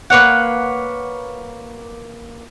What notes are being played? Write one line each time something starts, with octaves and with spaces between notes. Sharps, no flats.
A#3 B4 C#5 F#5